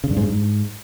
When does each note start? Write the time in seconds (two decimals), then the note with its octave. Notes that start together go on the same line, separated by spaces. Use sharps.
0.04 C#3
0.10 G2
0.17 G#2
0.23 G2
0.29 G#2